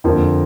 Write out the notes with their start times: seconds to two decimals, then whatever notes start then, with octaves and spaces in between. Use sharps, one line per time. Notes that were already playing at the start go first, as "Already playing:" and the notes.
0.04 F2 D3 F3 A#3